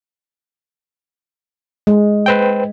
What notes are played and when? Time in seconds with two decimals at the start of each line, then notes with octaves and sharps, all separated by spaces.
1.87 G#3
2.26 B4 C5 G5